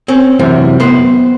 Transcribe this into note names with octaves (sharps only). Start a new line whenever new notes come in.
C4 C#4
F#2 C3 E3
B3 B4 C5